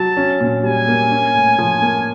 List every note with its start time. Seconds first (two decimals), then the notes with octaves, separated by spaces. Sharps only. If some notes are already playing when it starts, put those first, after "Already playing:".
Already playing: F#3 A5
0.17 C#4
0.40 A#2
0.63 G3 G#5
0.88 A#3
1.11 C#4
1.34 A2
1.58 F3
1.82 A#3